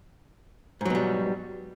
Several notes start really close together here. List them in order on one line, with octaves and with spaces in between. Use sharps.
G#2 F#3 B2 G3